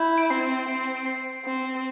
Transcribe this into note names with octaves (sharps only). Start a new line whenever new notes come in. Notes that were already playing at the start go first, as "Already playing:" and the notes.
Already playing: E4 G6
D7
C4 C7
C4 D7
D7
C7
C4